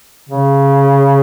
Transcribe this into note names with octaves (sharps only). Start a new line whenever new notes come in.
C#3